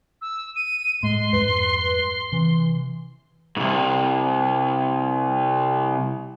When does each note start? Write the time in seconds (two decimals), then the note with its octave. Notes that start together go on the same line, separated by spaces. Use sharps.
0.21 E6
0.56 D#7
1.03 A2 G#3 C6
1.33 F2 G#2 G3 B4
2.32 C3 E3
3.57 C2 G#2